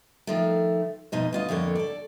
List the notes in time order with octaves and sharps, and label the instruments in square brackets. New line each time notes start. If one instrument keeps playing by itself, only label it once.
[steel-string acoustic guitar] D#3 F3 A3
F2 B2 D#4 C5
D2 F4 D#5
F2 D3 A#3 C#5
A4 D5